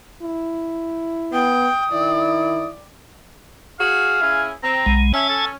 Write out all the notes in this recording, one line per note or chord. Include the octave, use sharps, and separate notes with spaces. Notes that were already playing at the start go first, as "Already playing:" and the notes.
E4
B3 G5 D#6
D#3 E4 D5
F#4 G#4 F5
C#4 E4 G#4
C4 A#5
B1 G#3
C#4 E5 G#5 A5
A4